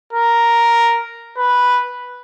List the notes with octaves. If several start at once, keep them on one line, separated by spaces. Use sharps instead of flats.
A#4
B4